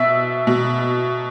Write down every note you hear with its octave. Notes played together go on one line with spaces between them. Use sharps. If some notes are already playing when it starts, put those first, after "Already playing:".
Already playing: B2 E5 E6
B2